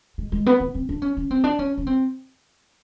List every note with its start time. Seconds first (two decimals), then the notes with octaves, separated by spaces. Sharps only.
0.18 G#3
0.32 G#3
0.46 B3
0.60 B3
0.74 C4
0.89 D4
1.02 C#4
1.17 C#4
1.31 C4
1.44 D4
1.59 C#4
1.78 C#4
1.87 C4